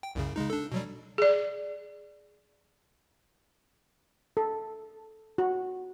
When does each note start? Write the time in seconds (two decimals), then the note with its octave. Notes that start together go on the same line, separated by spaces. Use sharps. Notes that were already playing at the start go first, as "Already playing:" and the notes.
0.03 G5
0.15 C2 F#2 C#3
0.36 C#3 G#3 D#4
0.50 D4 A4
0.72 B2 F#3 G3
1.18 G#4 D5
4.37 A4
5.38 F#4